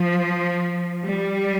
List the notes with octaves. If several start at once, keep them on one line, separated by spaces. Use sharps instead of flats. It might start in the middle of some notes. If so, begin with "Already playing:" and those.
Already playing: F3
G3